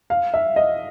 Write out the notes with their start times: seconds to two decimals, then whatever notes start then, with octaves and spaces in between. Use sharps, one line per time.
0.10 F5
0.34 E5
0.56 D#5